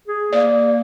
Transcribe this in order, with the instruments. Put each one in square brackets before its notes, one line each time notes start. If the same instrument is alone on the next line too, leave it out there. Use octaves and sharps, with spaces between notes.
[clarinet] G#4
[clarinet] A#3 [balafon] D5